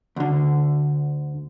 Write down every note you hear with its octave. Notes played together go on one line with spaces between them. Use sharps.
D2 D3